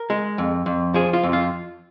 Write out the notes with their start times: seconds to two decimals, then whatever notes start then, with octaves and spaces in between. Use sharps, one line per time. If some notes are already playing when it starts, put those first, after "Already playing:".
Already playing: A#4
0.10 G#3
0.38 F2
0.66 F2
0.94 F3 G#4
1.13 F4
1.23 F2
1.33 F4